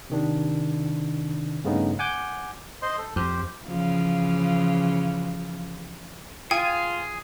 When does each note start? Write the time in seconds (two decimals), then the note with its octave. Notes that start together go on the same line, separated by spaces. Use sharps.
0.10 C3 D#3 D4
1.64 G2 C#3 A3 B3 C#4 D#4
1.99 F#5 G#5 D6 G6
2.82 C5 D#5 C6
2.98 A4
3.16 F2 G4 C5
3.66 C#3 E3 F3
6.51 F4 G#4 G5 G#5